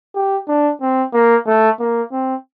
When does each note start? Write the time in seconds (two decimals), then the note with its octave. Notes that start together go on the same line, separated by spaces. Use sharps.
0.15 G4
0.48 D4
0.81 C4
1.13 A#3
1.47 A3
1.79 A#3
2.12 C4